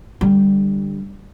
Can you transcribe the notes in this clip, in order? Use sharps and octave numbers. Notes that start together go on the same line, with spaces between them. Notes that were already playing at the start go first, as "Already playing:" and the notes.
D3 G3